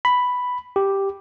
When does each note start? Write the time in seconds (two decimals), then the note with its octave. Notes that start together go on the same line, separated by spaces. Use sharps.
0.05 B5
0.76 G4